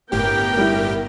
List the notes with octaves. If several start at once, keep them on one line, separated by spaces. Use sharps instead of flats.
G1 A2 B3 G4 A#4 G5
G3 E4